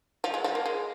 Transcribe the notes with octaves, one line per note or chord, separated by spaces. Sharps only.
F3
G#3
F3
A#3
G#3